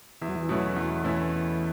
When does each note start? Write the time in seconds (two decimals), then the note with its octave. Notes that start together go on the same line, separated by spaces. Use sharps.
0.22 E2 E3
0.28 F#3
0.35 E3
0.49 B2 F#3 A3 C#4 E4
0.76 E2 E3
1.04 B2 A3 C#4 E4